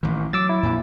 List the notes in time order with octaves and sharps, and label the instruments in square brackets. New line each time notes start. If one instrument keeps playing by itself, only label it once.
[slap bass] A1 D#3
[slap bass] F#3 [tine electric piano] D6 E6 A6
[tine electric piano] E4
[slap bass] F2 A#2